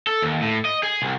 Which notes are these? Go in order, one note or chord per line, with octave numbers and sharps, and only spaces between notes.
A4
D#2
A2
D#5
G#4
C2